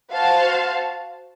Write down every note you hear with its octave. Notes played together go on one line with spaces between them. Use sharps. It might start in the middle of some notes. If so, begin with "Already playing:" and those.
F#4 C5 F5 A5